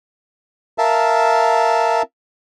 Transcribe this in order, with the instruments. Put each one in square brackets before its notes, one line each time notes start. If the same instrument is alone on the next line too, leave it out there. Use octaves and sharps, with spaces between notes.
[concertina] A#4 E5 F5 A5